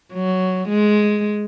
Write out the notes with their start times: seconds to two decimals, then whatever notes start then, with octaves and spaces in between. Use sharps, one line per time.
0.14 F#3
0.69 G#3